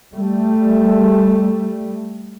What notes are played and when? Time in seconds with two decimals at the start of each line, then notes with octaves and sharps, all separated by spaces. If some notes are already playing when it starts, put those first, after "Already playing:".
0.14 G3 A3